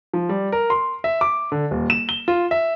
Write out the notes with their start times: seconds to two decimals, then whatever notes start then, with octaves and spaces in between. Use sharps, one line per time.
0.13 F3
0.29 G3
0.52 A#4
0.70 C6
1.04 E5
1.21 D6
1.52 D3
1.71 D#1
1.90 E7
2.09 G7
2.28 F4
2.51 E5